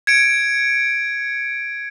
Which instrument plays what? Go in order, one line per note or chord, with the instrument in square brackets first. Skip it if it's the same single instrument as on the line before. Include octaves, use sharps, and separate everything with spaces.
[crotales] G#6 C#7 D7